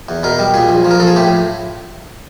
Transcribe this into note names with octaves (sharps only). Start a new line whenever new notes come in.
E2
B2 A#4
G3
A#2 G#4
A#1
F3
A#4
F3 A4
G#4
A2 G4